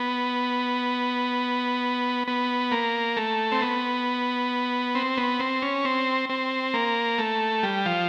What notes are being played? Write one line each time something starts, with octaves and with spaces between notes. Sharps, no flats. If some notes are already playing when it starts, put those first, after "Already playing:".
Already playing: B3
B3
A#3
A3
C4
B3
C4
B3
C4
C#4
C4
C4
A#3
A3
G3
F3